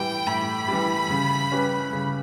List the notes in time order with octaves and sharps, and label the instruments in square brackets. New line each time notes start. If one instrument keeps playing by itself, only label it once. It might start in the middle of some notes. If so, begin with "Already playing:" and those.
Already playing: [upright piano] A2 E3 G3 [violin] G5
[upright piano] A2 [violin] B5
[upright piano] E3 G3
C#3
G3 C#4 G4 B4
C#3